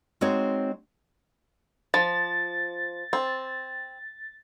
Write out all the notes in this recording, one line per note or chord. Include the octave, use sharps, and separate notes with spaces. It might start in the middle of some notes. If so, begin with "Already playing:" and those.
G#3 C4 D#4 F#4 C#5
F3 A6
C4